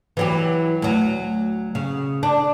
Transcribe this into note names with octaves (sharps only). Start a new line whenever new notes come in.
E3 F#3 G4
D2 F#3
C#3
D4